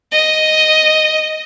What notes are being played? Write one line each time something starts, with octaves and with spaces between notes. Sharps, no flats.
D#5